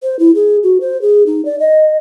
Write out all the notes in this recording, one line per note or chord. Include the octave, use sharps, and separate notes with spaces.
C5
E4
G#4
F#4
C5
G#4
D#4
D5
D#5